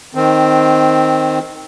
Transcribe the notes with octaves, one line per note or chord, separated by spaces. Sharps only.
D#3 C4